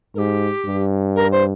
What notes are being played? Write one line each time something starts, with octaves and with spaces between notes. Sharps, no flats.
G#2 G4 A#4
G2
A#4
C5